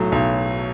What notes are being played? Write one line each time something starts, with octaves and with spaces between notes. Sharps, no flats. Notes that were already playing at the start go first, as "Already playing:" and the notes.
Already playing: B1 A2 F#3 A3
B1